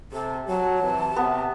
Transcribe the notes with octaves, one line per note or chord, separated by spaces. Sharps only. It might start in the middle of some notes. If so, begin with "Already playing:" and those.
C3 A4
F#3 A5
C3 E3
C3 B3